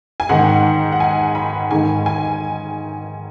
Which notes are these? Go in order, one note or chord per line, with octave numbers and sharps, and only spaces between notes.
G#5
G#2 D#3 F#5
F#5
G#5
B5
G#2 D#3 G#5
G#5